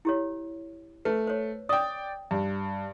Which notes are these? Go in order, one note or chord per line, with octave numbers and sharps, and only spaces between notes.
E4 G4 C#5
A3 B4
C5 C#5
D5 G5 D#6
G2